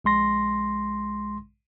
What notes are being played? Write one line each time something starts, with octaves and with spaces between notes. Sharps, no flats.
A#1 G#3 C6 A#6